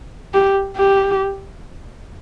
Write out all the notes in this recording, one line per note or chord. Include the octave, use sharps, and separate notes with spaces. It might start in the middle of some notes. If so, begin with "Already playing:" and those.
G4
G4